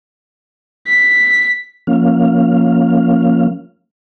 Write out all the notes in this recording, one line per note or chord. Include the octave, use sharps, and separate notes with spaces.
B6
F3 A#3 C#4 F5